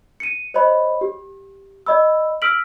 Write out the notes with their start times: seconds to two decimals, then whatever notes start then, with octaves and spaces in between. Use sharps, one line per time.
0.20 C#7 D#7
0.54 C5 C#5 D#5 B5
1.01 G4
1.86 D5 D#5 B5 E6
2.42 E6 F6 B6 D7 F#7